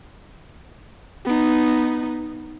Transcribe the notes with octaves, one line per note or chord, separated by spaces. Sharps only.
B3 D#4